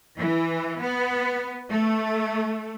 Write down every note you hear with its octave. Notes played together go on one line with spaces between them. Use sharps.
E3
B3
A3